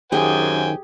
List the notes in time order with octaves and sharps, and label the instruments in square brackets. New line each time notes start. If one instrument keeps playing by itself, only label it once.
[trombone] F#2 [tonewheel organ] D#3 [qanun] G4 G#4 [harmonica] C5 G5 G#5